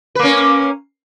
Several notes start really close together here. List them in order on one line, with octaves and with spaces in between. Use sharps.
B4 A#3 C#4